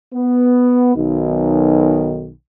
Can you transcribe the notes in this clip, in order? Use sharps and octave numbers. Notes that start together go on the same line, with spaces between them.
B3
B1 D#3